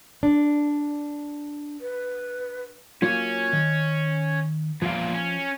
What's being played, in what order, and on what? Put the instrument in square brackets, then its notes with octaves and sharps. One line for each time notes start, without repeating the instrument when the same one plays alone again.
[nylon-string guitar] D4
[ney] B4
[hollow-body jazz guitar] F#3 A#3 F4 [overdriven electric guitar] C#4
[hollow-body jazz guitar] D#3
[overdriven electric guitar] E2 A#2 [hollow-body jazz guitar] F3 F5
[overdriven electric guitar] C#4